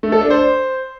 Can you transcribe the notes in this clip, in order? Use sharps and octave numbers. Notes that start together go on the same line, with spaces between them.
A3
A4
D4
C5